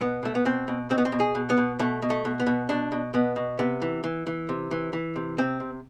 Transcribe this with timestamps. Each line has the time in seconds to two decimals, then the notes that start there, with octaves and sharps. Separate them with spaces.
0.01 B2 B3
0.23 B2 A3
0.35 B3
0.45 B2 C4
0.68 B2
0.90 B2 C4
0.98 B3
1.05 C4
1.12 B2
1.20 G#4
1.35 B2
1.50 B3
1.58 B2
1.79 B2 A3
2.02 B2
2.10 A3
2.25 B2
2.40 B3
2.47 B2
2.69 B2 D4
2.92 B2
3.14 B2 B3
3.36 B2
3.59 C3 B3
3.82 E3
4.04 E3
4.27 E3
4.49 C3
4.71 E3
4.93 E3
5.16 C3
5.38 C3 C4
5.60 C3